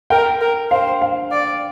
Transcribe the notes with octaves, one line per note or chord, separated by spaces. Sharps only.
A#4 G5
A#4
C5 F5
F5
D5